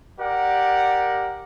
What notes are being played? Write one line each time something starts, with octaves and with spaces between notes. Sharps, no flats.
G4 A#4 D5 F#5